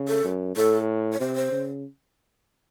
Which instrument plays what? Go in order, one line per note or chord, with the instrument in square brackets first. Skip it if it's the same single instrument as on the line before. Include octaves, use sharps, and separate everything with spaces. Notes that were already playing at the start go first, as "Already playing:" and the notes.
Already playing: [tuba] C#3
[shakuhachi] A4
[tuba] F#2
[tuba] A2 [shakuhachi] A4
[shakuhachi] C#5
[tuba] C3 [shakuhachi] C5
[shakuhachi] C5
[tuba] C#3